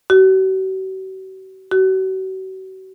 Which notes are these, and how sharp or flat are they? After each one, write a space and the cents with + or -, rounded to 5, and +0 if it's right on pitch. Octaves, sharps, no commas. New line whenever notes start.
F#4 +45
F#4 +40